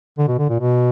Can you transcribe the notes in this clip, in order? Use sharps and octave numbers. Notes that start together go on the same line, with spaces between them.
D3
B2
D3
A#2
B2